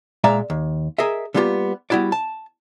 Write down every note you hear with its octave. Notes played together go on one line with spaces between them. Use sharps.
A#2 G#3 D5 E5 F5 A#5
D#2
G#4 A#4 D#5 E5
D3 G3 A#3 B3 F4 G4
G3 B3 E4 F#4 D5
A5